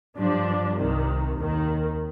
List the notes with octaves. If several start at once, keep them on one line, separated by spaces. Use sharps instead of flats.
G2 F3 D4
C2 C3 D#3
D#2 D#3